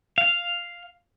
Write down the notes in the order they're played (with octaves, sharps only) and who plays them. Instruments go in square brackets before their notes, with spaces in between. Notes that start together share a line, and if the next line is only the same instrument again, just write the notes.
[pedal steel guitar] F5